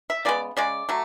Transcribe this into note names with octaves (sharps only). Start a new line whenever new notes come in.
E5
C#3 G#3 B3 D5
C#3 G#3 D5
F#3 A3